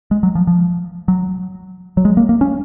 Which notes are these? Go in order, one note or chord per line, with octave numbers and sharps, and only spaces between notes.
G#3
F#3
F3
F3
F#3
F#3
G#3
A#3
A#3
C#4